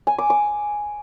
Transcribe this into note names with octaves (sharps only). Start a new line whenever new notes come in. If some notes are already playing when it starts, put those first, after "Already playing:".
G#5
D6
D6